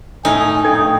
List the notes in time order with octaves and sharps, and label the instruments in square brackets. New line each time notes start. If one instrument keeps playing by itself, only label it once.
[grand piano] A2 [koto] D#4 [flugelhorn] G#5
[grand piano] A#1 A3 G#6 [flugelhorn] G5